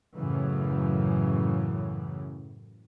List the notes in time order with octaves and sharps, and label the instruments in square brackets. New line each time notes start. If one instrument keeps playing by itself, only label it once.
[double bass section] F#2 A2 C#3 E3